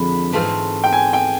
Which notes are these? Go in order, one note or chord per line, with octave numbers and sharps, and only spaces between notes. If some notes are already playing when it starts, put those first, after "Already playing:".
Already playing: F2 D3 F3 G#3 B5
G#2 E3 A3 C4 F4
G5
G#5
G5